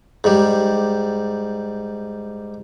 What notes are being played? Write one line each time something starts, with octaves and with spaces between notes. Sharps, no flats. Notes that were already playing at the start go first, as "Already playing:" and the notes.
G#2 G3